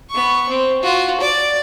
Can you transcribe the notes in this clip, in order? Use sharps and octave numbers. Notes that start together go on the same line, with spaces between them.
B3 C#6
C4
F4 F#4
D5